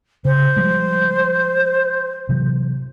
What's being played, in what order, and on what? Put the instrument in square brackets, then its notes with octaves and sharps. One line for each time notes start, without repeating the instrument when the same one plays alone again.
[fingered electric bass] C#3 [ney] C5
[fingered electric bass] F3 G3 G#3
C3 E3 F#3